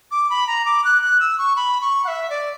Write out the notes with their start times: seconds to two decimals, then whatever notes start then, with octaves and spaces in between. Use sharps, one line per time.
0.11 D6
0.30 B5
0.47 A#5
0.65 D6
0.84 F#6
1.02 F#6
1.20 E6
1.38 C#6
1.56 B5
1.81 C#6
2.05 F#5
2.08 E5
2.30 D5